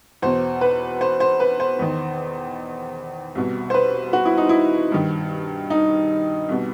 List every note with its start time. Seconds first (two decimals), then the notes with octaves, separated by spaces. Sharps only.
0.22 E2 B2 C5
0.61 B4
1.01 C5
1.20 C5
1.40 B4
1.60 C5
1.79 E2 D#3
3.35 C2 B2
3.70 C5
3.74 B4
4.13 F#4
4.25 E4
4.37 D#4
4.49 E4
4.92 G2 D#3
5.70 D#4
6.49 C2 B2